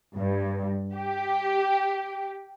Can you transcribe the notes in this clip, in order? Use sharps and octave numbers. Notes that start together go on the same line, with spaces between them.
G2
G4